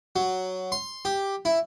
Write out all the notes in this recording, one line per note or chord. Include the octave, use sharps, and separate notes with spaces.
F#3
C6
G4
E4